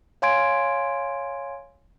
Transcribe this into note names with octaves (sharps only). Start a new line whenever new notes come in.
C#5 F5 G#5 C6 G#6 D7